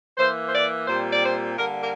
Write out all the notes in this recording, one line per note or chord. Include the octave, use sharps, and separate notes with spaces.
E3 A#3 C5
C5
D5
A#2 G3 C4 C5
D5
C5
D3 G3 A#3 A#4
A#4